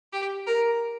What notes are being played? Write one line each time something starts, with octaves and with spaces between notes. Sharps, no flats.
G4
A#4